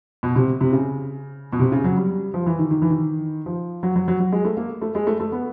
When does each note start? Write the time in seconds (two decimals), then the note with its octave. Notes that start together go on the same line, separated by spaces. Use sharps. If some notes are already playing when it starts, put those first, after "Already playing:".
0.23 B2
0.35 C3
0.61 C3
0.72 C#3
1.53 B2
1.59 C3
1.72 C#3
1.84 F#3
1.97 G3
2.34 F3
2.46 E3
2.59 D#3
2.71 D#3
2.82 E3
2.90 D#3
3.46 F3
3.83 F#3
3.96 F#3
4.08 F#3
4.20 F#3
4.32 G#3
4.44 A3
4.57 A#3
4.82 A3
4.95 G#3
5.07 A3
5.20 A3
5.32 B3